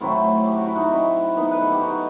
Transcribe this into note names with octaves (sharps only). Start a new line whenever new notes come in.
A2 F#3 A3 C4 E4
G4
F#4
E4
D#4 F#4
C4 E4
B3 D#4
B4
A4
G4
D#4 F#4